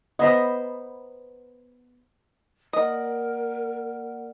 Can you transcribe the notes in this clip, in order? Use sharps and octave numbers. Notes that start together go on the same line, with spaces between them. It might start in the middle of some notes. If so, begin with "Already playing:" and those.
B3 C5 D#5 A#5 B5 D#6
A#3 A#4 D5 D#5 F#5